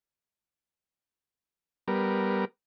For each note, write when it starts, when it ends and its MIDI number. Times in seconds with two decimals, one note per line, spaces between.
1.88 2.45 55
1.88 2.45 59
1.88 2.45 70